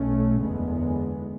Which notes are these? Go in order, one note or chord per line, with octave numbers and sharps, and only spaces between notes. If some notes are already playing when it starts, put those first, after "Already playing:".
Already playing: B1 B2 A3 C#4
F#1 E2 D3 G#3 B3